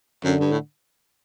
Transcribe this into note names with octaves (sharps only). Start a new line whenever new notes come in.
F#2 D3
G2
A2